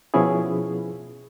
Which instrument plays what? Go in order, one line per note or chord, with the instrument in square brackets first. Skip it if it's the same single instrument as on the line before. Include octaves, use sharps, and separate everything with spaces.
[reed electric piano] B2 F3 B3 C#4 E4 G#4